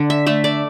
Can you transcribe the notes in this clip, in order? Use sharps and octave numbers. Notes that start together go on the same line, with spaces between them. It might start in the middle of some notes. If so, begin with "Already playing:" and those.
Already playing: D3
E5
A3 E5
D5